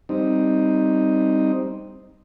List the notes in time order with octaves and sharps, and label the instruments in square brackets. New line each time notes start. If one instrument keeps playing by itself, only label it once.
[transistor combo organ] G3 C4 D#4